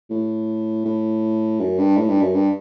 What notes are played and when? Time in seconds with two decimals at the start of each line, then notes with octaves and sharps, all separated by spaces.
0.10 A2
0.85 A2
1.60 F#2
1.78 G2
1.97 A2
2.09 G2
2.22 F#2
2.34 G2